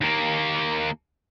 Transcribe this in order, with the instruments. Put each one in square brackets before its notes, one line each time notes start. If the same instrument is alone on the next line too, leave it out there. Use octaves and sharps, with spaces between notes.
[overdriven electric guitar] D#2 A#3